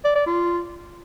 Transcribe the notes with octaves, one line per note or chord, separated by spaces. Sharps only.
D5
D5
F4